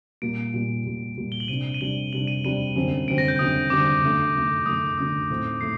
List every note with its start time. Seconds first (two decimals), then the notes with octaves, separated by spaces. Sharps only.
0.22 A#2 G3 A#3 D7
0.54 A#2 G3 A#3
0.86 A#2 G3 A#3
1.17 A#2 G3 A#3
1.32 G7
1.40 F#7
1.48 C3 G3 D4 D#7
1.74 D#7
1.81 C3 G3 D4 F#7
2.12 C3 G3 D4 F#7
2.27 D#7
2.44 C3 G3 D4 D#7
2.76 F#2 D3 G3 C4
3.08 F#2 D3 G3 C4 D7
3.18 A#6
3.28 G6
3.39 F#2 D3 G3 C4 D#6
3.70 F#2 D3 G3 C4 D6
4.02 F#2 D3 A3
4.34 F#2 D3 A3
4.66 F#2 D3 A3 D#6
4.98 F#2 D3 A3 D#6
5.30 A2 A3 C4 D#4
5.61 A2 A3 C7